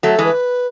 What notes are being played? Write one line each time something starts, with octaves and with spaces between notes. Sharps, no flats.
F#3 A3 A4
A4
E3 G#3
B4